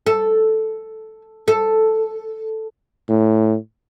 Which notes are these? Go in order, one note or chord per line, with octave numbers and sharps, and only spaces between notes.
A4
A4
A2